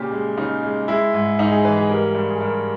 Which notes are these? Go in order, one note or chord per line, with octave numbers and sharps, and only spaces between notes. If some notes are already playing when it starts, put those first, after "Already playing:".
Already playing: A#2 C#3 G4
G#3
C#3 D#4
G#3
G#3 E4
G#2
G#2 D#4
G#4
E3 B4
G#4
G3 A#4
G2
G#4
G2 A#4